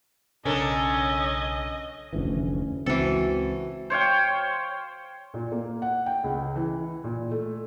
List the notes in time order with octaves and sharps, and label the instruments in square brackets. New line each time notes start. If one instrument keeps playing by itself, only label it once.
[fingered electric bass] B1 C#3 [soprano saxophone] C#4 [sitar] D4 A4 A#4 [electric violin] D#5
[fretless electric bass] F1 D2 E3 [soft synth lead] C#4
[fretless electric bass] C#2 C4 [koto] E3 A4 [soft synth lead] F#4
[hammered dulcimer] C5 C#5 F5 G5
[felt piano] A#2
A#3
F#5
G5
C#2
E3
A#2
A3